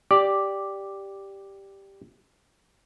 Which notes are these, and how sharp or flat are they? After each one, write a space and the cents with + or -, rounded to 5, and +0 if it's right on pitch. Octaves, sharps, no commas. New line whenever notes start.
G4 +0 D5 +0